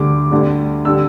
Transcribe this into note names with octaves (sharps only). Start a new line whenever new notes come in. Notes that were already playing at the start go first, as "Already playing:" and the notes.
Already playing: D2 D3 G3 D6
D2 D3 G3
D3 G3 E6